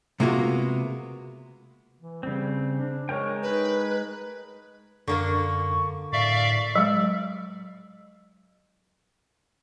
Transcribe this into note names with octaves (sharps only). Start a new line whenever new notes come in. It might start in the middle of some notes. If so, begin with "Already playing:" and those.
C3 G#3 A#3 B3 F4 F#4
E3
C#3 G3 C4
D4
G#3 A#4 C#5 G5
D#4 B4
F#2 D3 A#3 D4 C#6
A2 D5 E5 F5 C#6
F#3 G#3